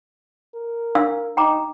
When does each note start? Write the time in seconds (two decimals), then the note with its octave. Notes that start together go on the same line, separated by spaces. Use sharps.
0.54 A#4
0.95 D4 F5 E6
1.37 D#4 G5 A#5 D6